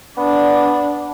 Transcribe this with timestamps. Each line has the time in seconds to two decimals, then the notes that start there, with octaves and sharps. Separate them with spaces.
0.17 B3 D4